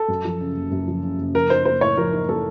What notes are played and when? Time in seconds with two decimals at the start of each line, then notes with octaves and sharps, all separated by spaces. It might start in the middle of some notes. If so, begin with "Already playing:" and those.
Already playing: A4
0.08 F#2
0.25 F3
0.41 C#3
0.56 F#1
0.71 F#2
0.88 F3
1.03 C#3
1.18 F#1
1.34 F3 A#4
1.50 D#4 C5
1.65 A#3 C5
1.81 A2 C#5
1.97 F3 A#4
2.13 D#4
2.29 A#3 A4